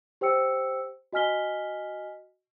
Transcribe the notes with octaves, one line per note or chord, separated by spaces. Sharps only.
G4 C5 G5 E6 C#7
F#4 D#5 G#5 F6 B6 G7